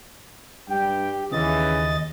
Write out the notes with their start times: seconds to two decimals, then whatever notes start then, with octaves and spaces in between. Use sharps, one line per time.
0.69 G2 G4 G5
1.32 D#2 C#3 E3 D#5 A6